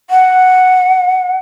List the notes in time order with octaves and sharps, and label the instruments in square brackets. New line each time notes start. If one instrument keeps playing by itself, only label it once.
[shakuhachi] F#5